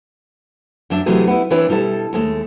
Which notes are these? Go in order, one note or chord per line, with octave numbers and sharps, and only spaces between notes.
F#2 F#3 D4 E5
C3 E3 F#3 A3 G#4
B3 E4
E3 C4 D4 E4 B4 C#5
B2 G3 E4 A4 A5
D#2 G#3 A3